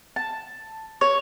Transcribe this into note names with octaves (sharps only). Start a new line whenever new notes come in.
A5
C#5